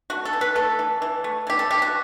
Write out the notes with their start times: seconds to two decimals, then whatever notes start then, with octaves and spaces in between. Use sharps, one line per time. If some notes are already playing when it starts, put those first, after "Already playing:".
0.10 A3 F#4
0.25 A4
0.33 E3
0.41 B4
0.55 A3 A4
0.79 E3
1.02 E3
1.24 A3
1.47 E3 G4
1.59 A4
1.71 A3 G4
1.82 F#4